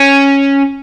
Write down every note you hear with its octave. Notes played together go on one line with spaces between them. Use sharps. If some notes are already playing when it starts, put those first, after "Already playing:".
Already playing: C#4